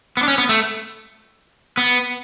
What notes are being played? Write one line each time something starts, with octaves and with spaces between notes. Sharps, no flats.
B3
D4
C#4
B3
A3
B3